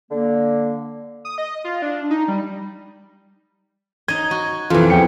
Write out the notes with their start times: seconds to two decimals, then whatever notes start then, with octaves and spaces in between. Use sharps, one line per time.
0.11 D3 A#3
1.25 D#6
1.38 D#5
1.64 F4
1.82 D4
2.10 D#4
2.28 G3
4.08 D#4 D#5 G#6
4.31 F#4
4.70 F2 B2 E3 F4
4.90 E2 G5 C#7